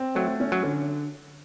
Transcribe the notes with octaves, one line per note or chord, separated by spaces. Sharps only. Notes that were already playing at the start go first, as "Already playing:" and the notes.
Already playing: C4
F#3 A3
C#4
F#3
D3